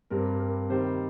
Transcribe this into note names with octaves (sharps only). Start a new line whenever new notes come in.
G2 G3 C4 A#4
A#4
C3 D#3 G3 C5